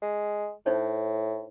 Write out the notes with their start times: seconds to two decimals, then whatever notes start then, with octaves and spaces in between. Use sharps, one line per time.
0.02 G#3
0.66 A2 D#4 C5 C#5